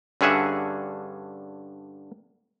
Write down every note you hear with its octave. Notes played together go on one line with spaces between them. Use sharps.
G2 D3 C#4 G#4 E5 F#5